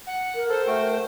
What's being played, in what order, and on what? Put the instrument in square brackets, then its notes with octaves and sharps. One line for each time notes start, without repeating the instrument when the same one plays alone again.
[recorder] F#5
[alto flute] A#4
[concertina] A4 [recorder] C5
[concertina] A3 F#4 G5 [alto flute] A#4